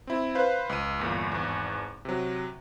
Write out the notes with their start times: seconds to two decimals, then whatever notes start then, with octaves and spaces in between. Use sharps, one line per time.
0.07 C4 E4
0.35 B4 C5 F5
0.69 C#2 D#7
1.00 G1 E2 A#2
1.32 G#1 E2
2.05 C3 F#3